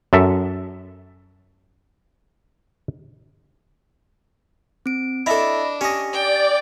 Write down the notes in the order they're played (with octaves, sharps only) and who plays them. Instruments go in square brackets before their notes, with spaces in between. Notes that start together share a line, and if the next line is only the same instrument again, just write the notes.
[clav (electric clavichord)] F#2 A4 E5
[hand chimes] C4 D7
[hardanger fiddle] D4 [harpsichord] E4 A4 [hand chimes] D#5 B5 A#6
[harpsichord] C#4 D#5 [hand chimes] G4
[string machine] D5 [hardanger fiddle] G5